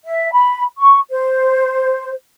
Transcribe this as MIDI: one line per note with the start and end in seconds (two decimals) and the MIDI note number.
0.04 0.30 76
0.33 0.63 83
0.78 0.98 85
1.11 2.12 72